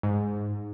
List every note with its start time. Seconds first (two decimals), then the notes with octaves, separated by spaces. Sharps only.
0.03 G#2